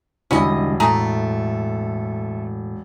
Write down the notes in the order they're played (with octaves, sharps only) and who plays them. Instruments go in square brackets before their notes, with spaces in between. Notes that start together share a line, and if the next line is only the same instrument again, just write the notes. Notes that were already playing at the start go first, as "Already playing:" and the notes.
[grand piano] E1 [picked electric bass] C2 D3 G3 [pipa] C#4 E4 D#5
[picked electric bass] A2 [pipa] A3 G#4 A#5